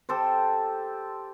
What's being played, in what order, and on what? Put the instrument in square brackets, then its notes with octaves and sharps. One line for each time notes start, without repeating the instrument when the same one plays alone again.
[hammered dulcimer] G4 A4 C5